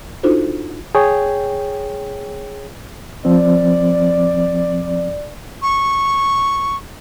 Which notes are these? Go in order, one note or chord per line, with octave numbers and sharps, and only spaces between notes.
D4 D#4 F4 F#4 A4 C5
G#4 C#5 G5
F3 C4 D5
C#6